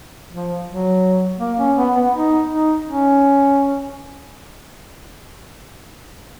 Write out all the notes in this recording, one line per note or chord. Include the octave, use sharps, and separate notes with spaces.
F3
F#3
A#3
C#4
B3
B3
D#4
D#4
C#4